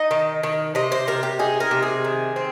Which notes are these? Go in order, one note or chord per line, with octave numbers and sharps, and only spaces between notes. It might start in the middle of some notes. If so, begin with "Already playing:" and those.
Already playing: D#4 D#5
D#3
D#3
C3 D#5
C5
C3 A#4
G4
D#4 G#4
A#4
C3
G#4
D#3
C4